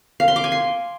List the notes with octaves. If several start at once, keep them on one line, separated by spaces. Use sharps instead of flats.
F5
C6
D6
G#5
C6